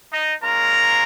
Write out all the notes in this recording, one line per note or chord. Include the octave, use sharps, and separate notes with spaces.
D#4 D#5
G#3 C#4 F4 A#4 A#5